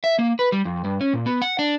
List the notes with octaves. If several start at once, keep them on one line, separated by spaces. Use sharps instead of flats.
E5
A#3
B4
G3
F2
G2
C#4
A#2
B3
F#5
D4